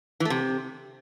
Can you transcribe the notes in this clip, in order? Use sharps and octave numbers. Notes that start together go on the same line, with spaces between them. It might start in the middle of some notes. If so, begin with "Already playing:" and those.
E3
A3
C3